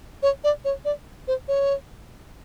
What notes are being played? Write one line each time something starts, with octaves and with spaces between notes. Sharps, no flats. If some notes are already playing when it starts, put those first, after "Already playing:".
C#5
D5
C#5
D5
C5
C#5